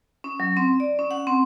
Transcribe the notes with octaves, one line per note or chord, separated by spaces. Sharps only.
C#4
F#3
C4
D5
C#4
F#5
C4